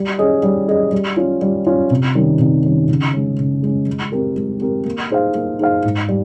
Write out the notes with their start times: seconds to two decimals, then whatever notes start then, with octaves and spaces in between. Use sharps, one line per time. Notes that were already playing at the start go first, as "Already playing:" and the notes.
Already playing: G3
0.19 C#4 G#4 D#5
0.43 G3
0.68 C#4 G#4 D#5
0.92 G3
1.17 C#4 F4
1.42 G3
1.66 C#4 F4
1.90 C3
2.15 D#3 G3 C#4
2.39 C3
2.64 D#3 G3 C#4
2.89 C#3
3.14 G#3 C#4
3.38 C#3
3.62 G#3 C#4
3.87 G#3
4.12 C4 G4 A#4
4.36 G#3
4.61 C4 G4 A#4
4.85 A#3
5.10 D#4 G#4 C5 F5
5.35 A#3
5.59 D#4 G#4 C5 F5
5.84 G#2
6.09 G3